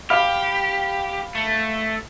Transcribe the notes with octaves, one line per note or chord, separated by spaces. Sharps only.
G4 F5 B5 F6
A3